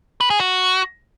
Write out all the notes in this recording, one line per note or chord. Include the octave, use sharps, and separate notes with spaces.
B4
G#4
F#4